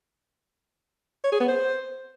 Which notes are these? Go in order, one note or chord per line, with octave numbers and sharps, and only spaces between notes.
C#5
G#4
B3
C5